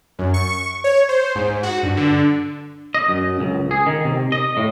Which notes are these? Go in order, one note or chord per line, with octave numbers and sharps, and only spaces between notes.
F#2
C#6
C#5
C5
G#2
F#4
G2
D3
D#5
F#2
C#2
G#4
D#3
C3
D#5
A2